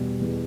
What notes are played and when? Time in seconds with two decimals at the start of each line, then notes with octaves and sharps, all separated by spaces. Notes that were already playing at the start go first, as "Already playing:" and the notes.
Already playing: E2 B2 G3
0.21 E2